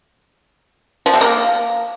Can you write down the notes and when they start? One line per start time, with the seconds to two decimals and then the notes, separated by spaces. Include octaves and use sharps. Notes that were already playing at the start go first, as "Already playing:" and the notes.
1.06 F3
1.13 C3
1.21 A#3